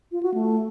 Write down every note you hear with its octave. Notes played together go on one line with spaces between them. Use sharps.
F4
F#4
A3